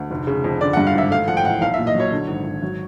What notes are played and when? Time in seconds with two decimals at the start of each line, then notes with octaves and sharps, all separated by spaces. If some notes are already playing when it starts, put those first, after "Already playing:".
Already playing: D2
0.11 F1
0.27 C#3
0.44 F2
0.61 D3 D5
0.73 G2 F#5
0.87 F5
0.95 G#1 E5
1.11 A3 F5
1.28 F3 F#5
1.37 G5
1.45 A1 F#5
1.61 B1 F5
1.74 A#2 E5
1.87 D#5
1.95 F#3 C#5
2.11 D3
2.28 G#1
2.45 G#1
2.62 F#3